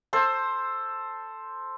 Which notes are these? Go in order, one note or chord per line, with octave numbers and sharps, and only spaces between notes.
A4 C5